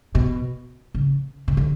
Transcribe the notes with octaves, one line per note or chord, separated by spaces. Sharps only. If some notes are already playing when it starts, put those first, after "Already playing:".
B2
C#3
C#3
D3